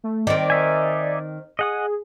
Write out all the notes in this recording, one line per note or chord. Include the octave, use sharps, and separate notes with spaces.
A3
D#3 C4 D5
D#4 E5 G#5
G#4 D#5 F#5 D#6